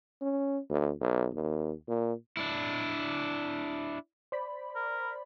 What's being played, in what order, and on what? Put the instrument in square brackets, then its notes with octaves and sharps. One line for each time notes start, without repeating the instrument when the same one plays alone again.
[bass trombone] C#4
D2
B1
D#2
A#2
[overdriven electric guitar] D4 E4
[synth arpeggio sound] C5 D5 B5
[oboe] A#4